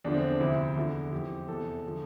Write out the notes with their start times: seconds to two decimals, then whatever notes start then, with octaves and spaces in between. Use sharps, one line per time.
0.04 E2 D3 F3 D4
0.14 C4
0.23 D4
0.40 D2 C3 F3 E4
0.76 E2 D3 F3
1.12 F2 E3 G4
1.48 E2 C3 E3 A4
1.86 D3 F3